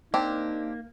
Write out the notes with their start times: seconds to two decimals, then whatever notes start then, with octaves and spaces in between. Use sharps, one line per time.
0.14 A#3 C4 D4 D#4 G4 G5